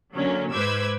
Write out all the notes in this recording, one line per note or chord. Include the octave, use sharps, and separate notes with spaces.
D3 F#3 A#3 C#4
G#2 B4 C5 D6 E6 G#6